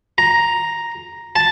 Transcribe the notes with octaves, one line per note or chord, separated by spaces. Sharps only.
A#5
A5